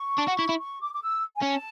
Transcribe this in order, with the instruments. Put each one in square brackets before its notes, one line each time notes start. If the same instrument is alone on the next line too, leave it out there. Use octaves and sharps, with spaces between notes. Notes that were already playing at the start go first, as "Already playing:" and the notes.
Already playing: [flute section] C#6
[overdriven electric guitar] D4
F#4
E4
E4
[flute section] C#6
D6
D6
E6
G#5
[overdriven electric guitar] C#4 [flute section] A5